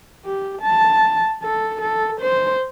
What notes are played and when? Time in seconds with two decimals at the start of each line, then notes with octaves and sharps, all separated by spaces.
0.25 G4
0.62 A5
1.43 A4
1.82 A4
2.21 C5